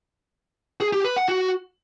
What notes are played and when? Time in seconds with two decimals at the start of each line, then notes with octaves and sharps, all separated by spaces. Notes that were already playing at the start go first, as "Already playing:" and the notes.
0.80 G#4
0.92 G4
1.04 B4
1.16 F#5
1.28 F#4